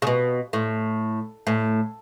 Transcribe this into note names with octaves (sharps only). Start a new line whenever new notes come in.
C#3
B2
A2
A2